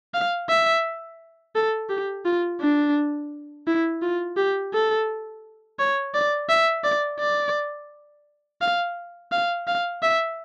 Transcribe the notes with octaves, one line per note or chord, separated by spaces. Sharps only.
F5
E5
A4
G4
F4
D4
E4
F4
G4
A4
C#5
D5
E5
D5
D5
F5
F5
F5
E5